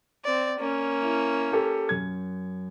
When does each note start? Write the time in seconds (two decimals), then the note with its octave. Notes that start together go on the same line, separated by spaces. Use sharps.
0.25 C4 D5
0.59 A#3 C#4
1.02 E4
1.52 G4 A4
1.89 F#2 G#6